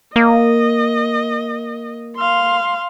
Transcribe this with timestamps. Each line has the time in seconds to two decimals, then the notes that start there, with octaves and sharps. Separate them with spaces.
0.16 A#3 D#5
2.17 F5 C6